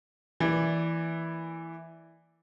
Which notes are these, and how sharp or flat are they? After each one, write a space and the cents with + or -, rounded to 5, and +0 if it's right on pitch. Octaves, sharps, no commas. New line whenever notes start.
E3 +0 A#3 -10 D5 +0